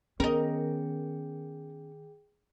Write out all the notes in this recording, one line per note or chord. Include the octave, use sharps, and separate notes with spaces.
D#3 B3 C#4 G#4 A#4 D#5 G5